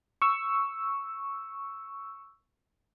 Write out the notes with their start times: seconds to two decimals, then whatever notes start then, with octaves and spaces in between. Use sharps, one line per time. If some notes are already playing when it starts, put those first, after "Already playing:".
0.22 C#6 E6